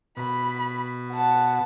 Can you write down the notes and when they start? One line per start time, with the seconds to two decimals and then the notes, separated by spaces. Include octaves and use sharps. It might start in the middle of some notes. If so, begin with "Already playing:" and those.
0.17 B2 B5
1.11 F#5 A5